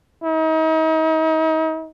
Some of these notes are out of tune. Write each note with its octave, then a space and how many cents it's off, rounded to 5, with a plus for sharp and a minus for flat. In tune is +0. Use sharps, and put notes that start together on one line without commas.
D#4 +40